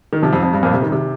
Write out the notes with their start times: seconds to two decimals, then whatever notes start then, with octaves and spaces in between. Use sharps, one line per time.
0.13 D#3
0.22 C3 F3
0.33 F2
0.43 F2
0.53 G2
0.63 F2 A#2
0.74 C3
0.82 D#3
0.92 C3